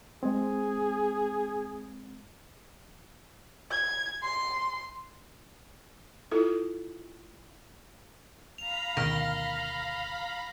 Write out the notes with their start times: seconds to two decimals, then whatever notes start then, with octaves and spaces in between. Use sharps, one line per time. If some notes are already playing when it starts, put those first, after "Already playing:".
0.23 G#3 C4 G#4
3.71 G#6
4.23 C6
6.31 E4 F4 A4
8.58 F5 A#5 B5 F7
8.97 D2 B2 D#3 F6 A#6